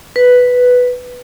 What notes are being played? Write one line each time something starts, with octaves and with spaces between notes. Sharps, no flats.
B4